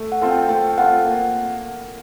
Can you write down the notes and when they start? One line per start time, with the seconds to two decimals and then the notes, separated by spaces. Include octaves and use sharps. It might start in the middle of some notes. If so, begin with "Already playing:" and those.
Already playing: A3
0.12 F#5
0.22 C4 F4 A4
0.31 G5
0.49 A3 G5
0.78 C4 F4 A4 F#5
1.05 A#3